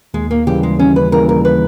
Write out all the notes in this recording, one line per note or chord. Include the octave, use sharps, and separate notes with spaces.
D#2 G#3
A#3
C#3 E3 G3 A#3 G4
G#3
D#2 C#4
B4
C#3 E3 G3 A#3 A#4
A#4
B4